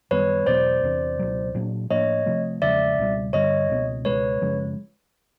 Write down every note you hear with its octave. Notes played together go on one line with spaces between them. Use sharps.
F#2 D#3 G3 B3 B4 C#5
E2 B2 F#3 B3 C5 D5
E2 C3 E3
C#2 B2 F#3
A#2 F#3 A#3 D4
A2 F3 A#3 D4 C#5 D#5
C3 F3 A3
E2 C#3 F3 G#3 D5 E5
C#2 B2 G3
G2 D3 G3 C#5 D#5
C#2 B2 G#3 B3
C#2 B2 G#3 B4 C#5
F#2 C#3 F3 G#3